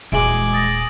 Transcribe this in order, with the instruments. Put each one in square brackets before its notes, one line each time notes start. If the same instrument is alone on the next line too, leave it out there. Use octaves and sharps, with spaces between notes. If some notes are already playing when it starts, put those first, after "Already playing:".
[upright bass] D#1 [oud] E3 F#3 G#3 [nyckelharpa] G#5 D6 [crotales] D7 F#7
[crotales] D#6 A6 A#6